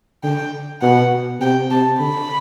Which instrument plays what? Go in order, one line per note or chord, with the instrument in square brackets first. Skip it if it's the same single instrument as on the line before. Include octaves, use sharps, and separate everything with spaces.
[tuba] D3 [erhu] G5
[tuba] B2 [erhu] F#5
[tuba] C3 [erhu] G5
[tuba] C3 [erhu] A5
[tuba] D3 [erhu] B5